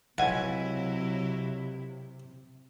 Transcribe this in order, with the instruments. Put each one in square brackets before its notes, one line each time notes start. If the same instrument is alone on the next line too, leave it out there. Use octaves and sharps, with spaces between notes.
[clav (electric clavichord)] C#2 G#5 [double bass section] C3 [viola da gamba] F#3 E4 [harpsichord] F#5